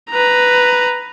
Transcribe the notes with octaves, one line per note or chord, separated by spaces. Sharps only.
B4 A#5